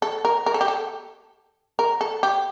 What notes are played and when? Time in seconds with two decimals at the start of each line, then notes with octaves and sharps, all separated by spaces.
0.02 A4
0.25 A#4
0.46 A#4
0.54 A4
0.61 G4
0.68 A4
1.79 A#4
2.01 A4
2.23 G4